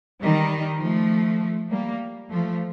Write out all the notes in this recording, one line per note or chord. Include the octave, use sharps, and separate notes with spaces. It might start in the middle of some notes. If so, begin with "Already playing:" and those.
D#3 G3
F3 A3
G3 A#3
F3 A3